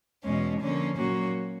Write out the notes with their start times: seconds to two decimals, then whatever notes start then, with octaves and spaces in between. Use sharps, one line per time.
0.24 E2 B2 G#3 C#4
0.60 D3 F3 A#3 C#4
0.97 A#2 F#3 A#3 C#4 F#4